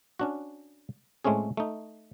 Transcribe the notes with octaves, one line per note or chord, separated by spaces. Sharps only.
C#4 D4 F#4
A2 G#3 A3 C4 C#4 G#4
A3 D#4